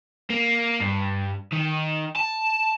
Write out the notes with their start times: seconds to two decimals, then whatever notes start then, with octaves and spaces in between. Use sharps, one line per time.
0.30 A#3
0.81 G2
1.52 D#3
2.16 A5